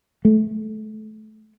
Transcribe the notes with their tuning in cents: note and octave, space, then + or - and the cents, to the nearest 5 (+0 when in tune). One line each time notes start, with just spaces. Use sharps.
A3 -25